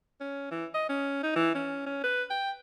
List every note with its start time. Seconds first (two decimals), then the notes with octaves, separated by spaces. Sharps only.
0.20 C#4
0.51 E3
0.74 D#5
0.89 C#4
1.23 D#4
1.36 E3
1.55 C#4
1.86 C#4
2.04 B4
2.30 G5